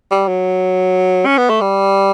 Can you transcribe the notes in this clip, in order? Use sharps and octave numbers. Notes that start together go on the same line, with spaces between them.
G3
F#3
C#4
B3
A3
G3